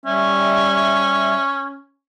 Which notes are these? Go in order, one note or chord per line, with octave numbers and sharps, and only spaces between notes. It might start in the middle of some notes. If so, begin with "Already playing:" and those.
G3 C#4 E5